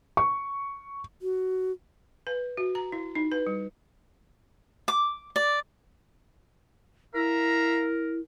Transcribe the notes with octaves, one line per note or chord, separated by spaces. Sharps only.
C#6
F#4
B4
F#4
A#5
E4
D#4
B4
G3
D6
D5
E4 A#4 E5 F5 A#5